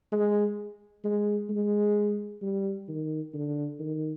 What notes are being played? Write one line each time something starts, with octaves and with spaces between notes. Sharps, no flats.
G#3
G#3
G#3
G3
D#3
D3
D#3